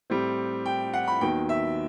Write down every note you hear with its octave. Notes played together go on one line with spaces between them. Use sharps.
A2 G3 C4
G5
F#5
B5
D#2 D#3 F#3 B3 G5
E5